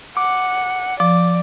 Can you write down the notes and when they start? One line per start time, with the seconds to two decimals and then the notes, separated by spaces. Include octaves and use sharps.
0.17 F#5 D6
1.00 F3 D5 D6